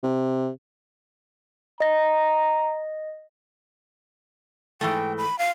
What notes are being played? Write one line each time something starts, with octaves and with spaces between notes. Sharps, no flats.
C3
D#5 A#5 A#6
G#2 E3 A3 G5
B5
F5